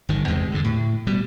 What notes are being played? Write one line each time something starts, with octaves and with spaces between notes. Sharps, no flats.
G1 D#3
E2 C3 G#3
G2 D3
A2
B2 G3